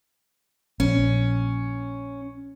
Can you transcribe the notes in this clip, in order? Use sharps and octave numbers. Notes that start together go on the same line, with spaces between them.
A#1 C#4